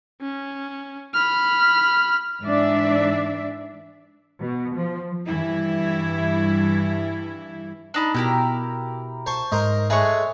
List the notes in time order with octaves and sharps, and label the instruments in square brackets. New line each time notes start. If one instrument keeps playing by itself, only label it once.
[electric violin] C#4
B5 F6
[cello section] G#2 E3 D4 D5 E5
B2
F3
G2 E3 E4
[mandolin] D4 D#4 B5
[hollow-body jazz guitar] B2 [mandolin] E4 G4 A#4
[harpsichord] C5 A5 C#6
[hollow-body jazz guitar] G#2 [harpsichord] A#4 C5 D#5
[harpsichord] G#3 A3 B4 [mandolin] G#4 C#5